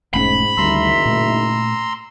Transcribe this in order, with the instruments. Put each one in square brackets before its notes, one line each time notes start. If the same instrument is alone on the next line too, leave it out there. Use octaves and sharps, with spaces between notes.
[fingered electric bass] E1 A3 C#4 [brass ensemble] G#2 [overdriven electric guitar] B5
[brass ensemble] F#1 D#3 E5 [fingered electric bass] D2 G3 [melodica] A#5 C6 E6
[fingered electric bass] A#2 A3